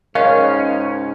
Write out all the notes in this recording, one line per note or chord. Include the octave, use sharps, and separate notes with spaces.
C#2 G#2 C#4 D#4 A#4 C#5 D#5 F5